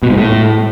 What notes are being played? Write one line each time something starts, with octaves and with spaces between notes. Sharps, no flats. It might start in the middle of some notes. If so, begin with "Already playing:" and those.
B2
G#2
A2